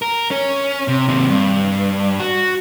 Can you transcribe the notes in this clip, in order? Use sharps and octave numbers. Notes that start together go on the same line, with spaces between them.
A#4
C#4
C3
D#2 C3
G2
F#4